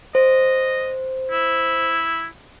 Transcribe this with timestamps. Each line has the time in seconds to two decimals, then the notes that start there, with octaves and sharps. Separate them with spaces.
0.15 C5 D#5
1.31 E4